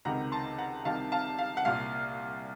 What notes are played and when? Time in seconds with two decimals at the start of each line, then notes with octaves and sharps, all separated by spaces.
0.05 C#2 C3 D#3 F#5 A#5
0.32 A5 C6
0.58 F#5 A#5
0.85 C2 C3 D#3 F5 A5
1.12 F5 A5
1.39 F5
1.57 F#5
1.65 C2 A#2 F5